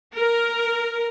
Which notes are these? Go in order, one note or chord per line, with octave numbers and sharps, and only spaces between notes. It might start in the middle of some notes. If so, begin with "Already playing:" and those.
A#4